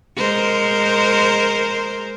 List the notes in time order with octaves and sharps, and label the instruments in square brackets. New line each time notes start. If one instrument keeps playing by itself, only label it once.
[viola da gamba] G#3 A#4 C5